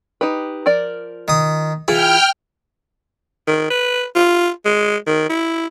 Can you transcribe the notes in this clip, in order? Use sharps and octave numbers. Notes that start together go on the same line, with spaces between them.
D#4 G4 B4
F3 A#4 D5
D#3 D#6
E3 E4 F4 G#4 G5 F6
D#3
B4
F4
G#3
D#3
E4